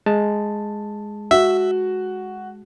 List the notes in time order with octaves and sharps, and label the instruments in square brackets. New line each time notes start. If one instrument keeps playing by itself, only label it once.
[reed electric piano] G#3 A5
[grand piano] F#4 [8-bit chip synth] E5